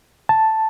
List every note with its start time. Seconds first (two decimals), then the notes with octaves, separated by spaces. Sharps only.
0.29 A5